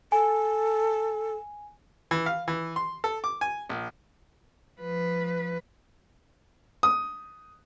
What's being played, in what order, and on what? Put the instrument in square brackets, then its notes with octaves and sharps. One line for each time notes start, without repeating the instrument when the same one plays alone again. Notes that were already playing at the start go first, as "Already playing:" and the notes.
[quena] A4 [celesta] G#5
[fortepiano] E3
F5
E3
C6
A4
D6
G#5
A#1
[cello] F3 B4
[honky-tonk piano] D#6